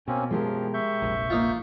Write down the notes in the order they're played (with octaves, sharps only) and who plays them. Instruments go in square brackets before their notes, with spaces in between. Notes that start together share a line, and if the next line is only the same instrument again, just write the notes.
[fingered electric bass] B2 [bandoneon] A#3 C4 C#4
[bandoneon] F#2 F3 [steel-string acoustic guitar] G#3 G4 A#4
[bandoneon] E5 C#6 G6
[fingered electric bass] F1 A#1
[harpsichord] A#3 D#4 F4